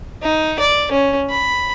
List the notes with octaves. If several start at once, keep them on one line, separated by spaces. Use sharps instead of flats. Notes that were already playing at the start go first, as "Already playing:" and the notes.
D#4
D5
C#4
B5